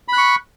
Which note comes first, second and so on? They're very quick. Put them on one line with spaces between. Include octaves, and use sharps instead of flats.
B5 F#6 C#6